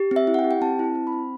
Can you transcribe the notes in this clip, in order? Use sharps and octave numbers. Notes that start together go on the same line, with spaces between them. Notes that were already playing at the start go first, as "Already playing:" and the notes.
Already playing: G4
C4 E5
E4
F#5
G5
G4
G5
C4 A5
E4 A5
C4
B5
C4